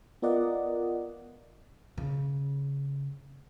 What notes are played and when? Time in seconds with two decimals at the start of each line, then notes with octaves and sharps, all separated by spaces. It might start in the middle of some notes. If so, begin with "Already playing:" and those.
0.22 B3 F4 A#4 D5 D#5 F#5
1.98 C#3